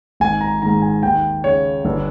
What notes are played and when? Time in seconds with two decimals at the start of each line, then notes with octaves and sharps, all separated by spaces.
0.20 G#1 G#5
0.41 A#5
0.62 G#2 D#3 A#5
0.82 G#5
1.03 D#2 G5
1.44 C#3 C#5
1.85 G1